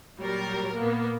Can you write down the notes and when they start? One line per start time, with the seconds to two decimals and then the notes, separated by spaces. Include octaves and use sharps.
0.18 A#2 F#3 G3 A#4
0.77 A#2 A#3 B3